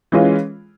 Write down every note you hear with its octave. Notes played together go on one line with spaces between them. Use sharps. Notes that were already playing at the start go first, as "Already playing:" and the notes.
E3 G#3 C#4 F4